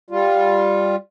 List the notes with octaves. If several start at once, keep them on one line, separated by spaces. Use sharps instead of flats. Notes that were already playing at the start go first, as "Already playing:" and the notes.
G3 F4